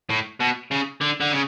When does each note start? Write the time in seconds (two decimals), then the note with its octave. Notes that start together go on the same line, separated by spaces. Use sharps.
0.10 A2
0.40 B2
0.71 C#3
1.01 D3
1.21 D3
1.32 C#3